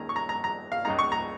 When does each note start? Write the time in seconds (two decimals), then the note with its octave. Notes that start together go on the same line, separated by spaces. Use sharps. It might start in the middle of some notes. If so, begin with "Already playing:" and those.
Already playing: D#2 D#3 G#3 C#4 A#5
0.09 C#6
0.16 A#5
0.29 A#5
0.44 A#5
0.72 F5
0.85 C#2 C#3 G#3 D#4 A#5
0.99 C#6
1.12 A#5